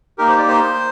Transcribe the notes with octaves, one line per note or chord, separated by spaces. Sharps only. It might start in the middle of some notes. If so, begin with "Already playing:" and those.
A#3 D#4 G4 A#4
C5
D5
C5